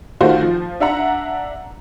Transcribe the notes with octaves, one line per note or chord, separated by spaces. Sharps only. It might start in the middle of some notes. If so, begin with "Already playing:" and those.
D#3 A3 F4 F#4 C5
F3
D4 E5 F#5 A#5